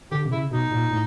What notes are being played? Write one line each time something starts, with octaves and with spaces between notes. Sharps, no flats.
D3 G4
C3
C#3 E4
B2 D#4
A#2
A2